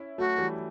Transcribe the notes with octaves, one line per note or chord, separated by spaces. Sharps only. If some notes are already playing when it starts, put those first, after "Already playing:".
Already playing: C#4 E4
F#3 A3 F#4
E3 G3